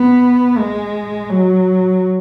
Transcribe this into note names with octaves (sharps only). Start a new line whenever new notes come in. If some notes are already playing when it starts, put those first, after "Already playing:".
Already playing: B3
G#3
F#3